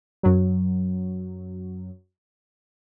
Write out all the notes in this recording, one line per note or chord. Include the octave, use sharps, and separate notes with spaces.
F#2 F#3